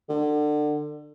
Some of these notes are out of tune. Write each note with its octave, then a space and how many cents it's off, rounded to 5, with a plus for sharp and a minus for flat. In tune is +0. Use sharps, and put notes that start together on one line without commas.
D3 +25